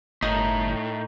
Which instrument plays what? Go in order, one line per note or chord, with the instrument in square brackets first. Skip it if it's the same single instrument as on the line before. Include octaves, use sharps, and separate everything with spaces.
[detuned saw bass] G1 [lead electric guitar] A2 [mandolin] D#4 A#4